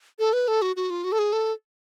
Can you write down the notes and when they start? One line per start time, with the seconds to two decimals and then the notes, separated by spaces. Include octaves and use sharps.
0.19 A4
0.33 B4
0.48 A4
0.62 F#4
0.76 F#4
0.90 F4
1.04 F#4
1.12 A4
1.19 G#4
1.32 A4